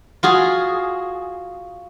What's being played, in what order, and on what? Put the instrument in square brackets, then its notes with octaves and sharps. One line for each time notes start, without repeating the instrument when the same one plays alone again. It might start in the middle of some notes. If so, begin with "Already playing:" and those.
[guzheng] F4 F#4 G#4